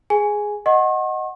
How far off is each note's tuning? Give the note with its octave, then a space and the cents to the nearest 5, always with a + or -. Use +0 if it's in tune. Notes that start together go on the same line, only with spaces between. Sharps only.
G#4 +0 G#5 +0
D#5 +0 F#5 +0 C#6 -45